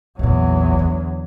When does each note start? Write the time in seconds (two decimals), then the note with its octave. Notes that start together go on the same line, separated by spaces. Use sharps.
0.19 A#1 E2 A#2 F#3
0.79 D3